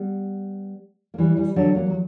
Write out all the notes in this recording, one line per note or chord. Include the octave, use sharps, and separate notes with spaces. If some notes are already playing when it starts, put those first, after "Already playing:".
Already playing: G3 B3
A#3
E3 G3
E3 G3
D3 F#3
F#3 A#3
F#3